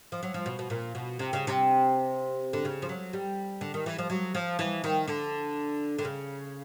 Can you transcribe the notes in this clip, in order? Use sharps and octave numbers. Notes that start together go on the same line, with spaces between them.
F3
F#3
F3
B2
B2
A#2
B2
C3
C#3
C3
D3
C#3
F3
F#3
G3
D3
D#3
E3
F3
F#3
F3
E3
D#3
D3
D3
C#3